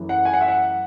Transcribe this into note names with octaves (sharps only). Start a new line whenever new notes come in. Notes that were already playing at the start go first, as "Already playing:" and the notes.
Already playing: F#2 E3 A3
F#5
G#5
F#5
E5
F#5